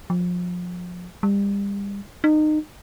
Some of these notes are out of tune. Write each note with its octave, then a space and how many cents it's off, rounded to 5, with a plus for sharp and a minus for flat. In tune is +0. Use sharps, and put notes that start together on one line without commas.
F3 +30
G3 +35
D#4 -25